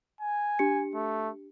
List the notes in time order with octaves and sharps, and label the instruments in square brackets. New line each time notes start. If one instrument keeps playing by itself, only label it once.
[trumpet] G#5
[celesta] D4 G4 C#7
[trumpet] A3